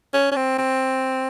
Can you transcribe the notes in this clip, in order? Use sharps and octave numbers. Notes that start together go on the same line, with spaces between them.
C#4
C#4
C4
C4